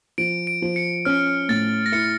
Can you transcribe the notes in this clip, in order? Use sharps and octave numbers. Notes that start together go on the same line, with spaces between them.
F3 D7
D7
F3
C#7
C#4 F6
A2 A6
A#6
E4 C#7